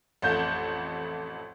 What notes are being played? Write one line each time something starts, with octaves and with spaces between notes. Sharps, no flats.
A1 F2 A3 A5 G6